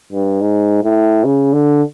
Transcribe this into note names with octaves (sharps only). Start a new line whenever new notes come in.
G2
G#2
A2
C#3
D3